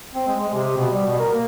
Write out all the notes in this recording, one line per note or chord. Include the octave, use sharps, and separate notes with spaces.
C4
G#3
G#3
C3
B2
G3
B2
A#4
A#3